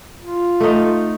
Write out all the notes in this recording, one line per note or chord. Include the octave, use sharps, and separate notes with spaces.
F4
A3 D#4